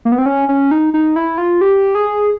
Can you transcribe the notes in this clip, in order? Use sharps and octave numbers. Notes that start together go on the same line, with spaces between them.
A#3
B3
C4
C#4
C#4
D#4
D#4
E4
F4
G4
G#4